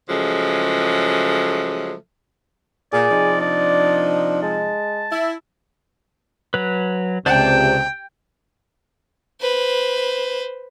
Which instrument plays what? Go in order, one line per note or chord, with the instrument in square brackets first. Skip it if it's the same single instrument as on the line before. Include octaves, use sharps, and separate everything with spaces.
[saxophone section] C#3 F3 F#3 G#3 A3
[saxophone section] A#2 [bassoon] G#4 [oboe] D5
[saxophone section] C3 F3 D#4
[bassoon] D4 [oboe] D5
[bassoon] G#3 [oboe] A5
[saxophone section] E4
[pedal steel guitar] F#3 B4
[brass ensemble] C#2 C3 [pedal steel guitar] C5 D5 A5 [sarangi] G5
[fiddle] B4 C5